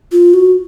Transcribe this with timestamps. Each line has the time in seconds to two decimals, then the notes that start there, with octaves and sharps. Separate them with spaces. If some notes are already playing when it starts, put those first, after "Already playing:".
0.12 F4
0.34 F#4